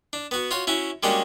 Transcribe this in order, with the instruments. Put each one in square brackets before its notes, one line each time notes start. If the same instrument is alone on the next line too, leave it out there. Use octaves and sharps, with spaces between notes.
[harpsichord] D4
B3 F#4
F4 F#4 C#5
C#4 E4 F#4
G3 G#3 A#3 C#4 D4 F#4